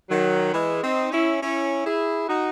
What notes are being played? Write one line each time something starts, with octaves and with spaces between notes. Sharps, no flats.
D#3 F#3
E3 G#3
C4 D#4
C#4 E4
C#4 E4
E4 G#4
D#4 F#4